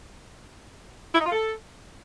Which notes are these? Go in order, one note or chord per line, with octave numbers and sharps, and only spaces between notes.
E4
D#4
F4
A4